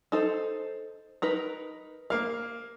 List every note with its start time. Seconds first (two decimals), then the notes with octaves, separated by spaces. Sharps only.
0.12 D#4 A4 C5
1.22 D#4 A#4 B4
2.10 A#3 F5 F6